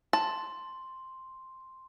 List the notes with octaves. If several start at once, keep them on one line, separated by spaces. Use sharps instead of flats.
A5 C6